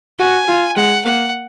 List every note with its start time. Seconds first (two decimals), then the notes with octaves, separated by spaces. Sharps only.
0.19 F#4 G#5
0.48 F4
0.76 G#3 F#5
1.05 A#3 F#5